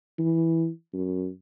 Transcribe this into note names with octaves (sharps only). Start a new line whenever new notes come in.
E3
F#2